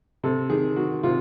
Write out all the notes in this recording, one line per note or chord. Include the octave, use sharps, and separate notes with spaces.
C3 A4
D#3 G#4
D#3 F#4
C3 F4